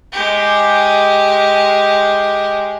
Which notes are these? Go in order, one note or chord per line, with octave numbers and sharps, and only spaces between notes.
G#3 G4